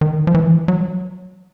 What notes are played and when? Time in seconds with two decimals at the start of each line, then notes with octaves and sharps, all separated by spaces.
0.01 D#3
0.27 F3
0.34 E3
0.68 F#3